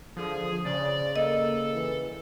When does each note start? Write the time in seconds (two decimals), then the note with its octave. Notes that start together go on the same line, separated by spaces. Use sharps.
0.17 D3 F3 G#4
0.65 C#3 C5 D5
1.16 A#3 A4 D#5
1.74 E3